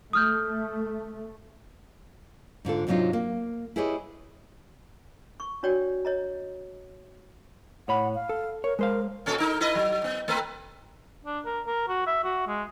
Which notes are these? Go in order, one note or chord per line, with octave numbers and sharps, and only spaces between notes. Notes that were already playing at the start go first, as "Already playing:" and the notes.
A3 D#6 F6 G6
G#2 D3 F4 A4
G#2 C3 F#3 D4 D#4 F4
A#3
E4 G4 G#4 B4 C#5 D#5
C#6
D4 F#4 C#5 D5 G5
C#5 D#5 A#5
A2 C#5 F#5 B5
F5
A4
A#4 C#5
G#3 A#4 C5 F5
A#2 C#4 A4
D#4 A#4
E4 B4 D#5
F#3
B3
A3 C4 B4
D4
A#4
A#4
F#4
E5
F#4
G#3